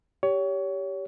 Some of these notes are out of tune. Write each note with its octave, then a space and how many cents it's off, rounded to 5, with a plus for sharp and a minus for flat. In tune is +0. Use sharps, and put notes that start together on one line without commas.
G4 +0 C#5 +25